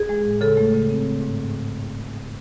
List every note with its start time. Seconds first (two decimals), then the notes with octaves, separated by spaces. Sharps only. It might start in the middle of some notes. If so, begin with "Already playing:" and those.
Already playing: G#4
0.09 G#3
0.24 A2
0.41 C#3 A4
0.57 A3
0.74 C#3
0.90 C4
1.05 A3
1.21 G#2